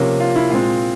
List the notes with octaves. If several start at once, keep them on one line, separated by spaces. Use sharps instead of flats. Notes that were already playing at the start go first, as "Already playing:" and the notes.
Already playing: C3 F3 A#3 C#4
F4
E4
A#2 G#3 C4 F4